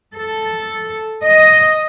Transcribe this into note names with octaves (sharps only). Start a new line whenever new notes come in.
A4
D#5